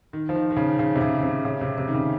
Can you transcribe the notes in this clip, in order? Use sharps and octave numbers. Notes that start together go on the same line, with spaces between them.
D#3
F3
D#3
D#3
C#3
C#3
C3
C#3
C3
C#3
C3
C3
D#3
C#3